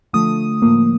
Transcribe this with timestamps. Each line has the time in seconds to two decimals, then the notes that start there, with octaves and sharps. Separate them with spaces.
0.13 D3 F3 A3 D#6
0.62 A2 F3 A#3